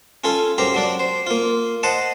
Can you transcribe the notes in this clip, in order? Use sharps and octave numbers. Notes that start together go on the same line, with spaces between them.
C#4 F4 A4
F#2 G4 C5 A#5
F#3 D4 D5
C5
A#3 F4
C5 D#5 F#5 A5